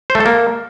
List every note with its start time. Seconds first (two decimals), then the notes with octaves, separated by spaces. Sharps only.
0.10 C5
0.15 A3
0.20 A4
0.26 A#3